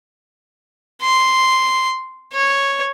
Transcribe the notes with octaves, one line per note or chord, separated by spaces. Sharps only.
C6
C#5